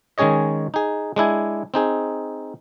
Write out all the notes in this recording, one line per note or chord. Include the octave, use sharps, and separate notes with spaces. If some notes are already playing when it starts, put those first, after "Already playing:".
D#3 G#3 C#4 G#4 C#5 D#5
D#4 G#4
G#3 D4 E4 G#5
C4 D#4 G#4